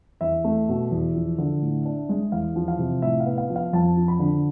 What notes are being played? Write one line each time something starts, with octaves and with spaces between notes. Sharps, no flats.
E2 E5
A3
B2
E2
F3
D3
A2
D4
G#3
E2 F5
F3
F5
C3
A2 E5
F5
B3
F5
F3
F5
F2 A5
F3
B5
D3